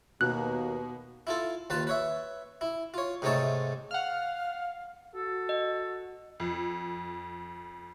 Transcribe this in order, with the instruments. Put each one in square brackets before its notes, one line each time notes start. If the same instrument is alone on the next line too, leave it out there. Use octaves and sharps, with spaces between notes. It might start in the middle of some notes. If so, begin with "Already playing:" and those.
[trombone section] D#2 A#3 B3 [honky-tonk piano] B2 [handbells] F#6
[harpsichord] E4 F4 A4
D#2 F4 B4 A5
B4 C#5 E5
E4
F4 C#5
G#2 C3 A3 D#4 C#5 A5
[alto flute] F5 [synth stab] F#5 F6
[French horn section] F#4 [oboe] A4
[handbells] D#5
[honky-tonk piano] F2